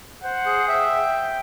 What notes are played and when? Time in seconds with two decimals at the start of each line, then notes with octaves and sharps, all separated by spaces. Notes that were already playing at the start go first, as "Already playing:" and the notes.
0.23 C5 F#5
0.46 G#4
0.68 E5 G5